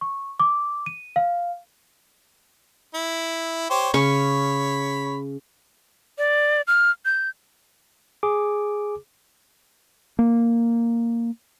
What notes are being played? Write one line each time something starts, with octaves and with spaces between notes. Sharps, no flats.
C#6
D6
D#7
F5
E4
G4 C5 C#5
C#3 C#4 C#5 B5 C#6
D5
F6
G6
G#4 D6
A#3